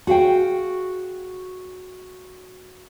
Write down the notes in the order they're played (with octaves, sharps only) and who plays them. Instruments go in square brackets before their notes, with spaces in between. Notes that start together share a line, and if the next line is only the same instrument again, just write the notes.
[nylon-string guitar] F#4 G#4 F5 G5